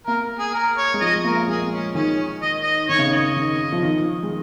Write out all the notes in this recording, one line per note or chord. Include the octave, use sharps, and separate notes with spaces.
A#3 A#4
G#4
A#4
C#5
G#3
F3 D#5
G#3
A#3 A#4
A#3
G#3 G#4
C#4
D#3 C#4
D#5
D#5
D#3 C#5
C#3
D#3
D#5
D#3
F3
D#3
G#3